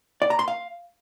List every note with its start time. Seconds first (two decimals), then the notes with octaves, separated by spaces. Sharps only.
0.22 D5
0.30 A#5
0.39 C6
0.48 F5